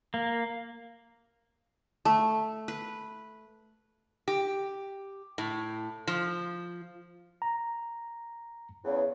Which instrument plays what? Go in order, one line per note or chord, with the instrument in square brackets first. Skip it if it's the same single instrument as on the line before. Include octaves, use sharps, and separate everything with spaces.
[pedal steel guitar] A#3
[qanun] A3
B4
[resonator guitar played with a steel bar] G4
A2
F3
[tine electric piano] A#5
[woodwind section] E2 C#3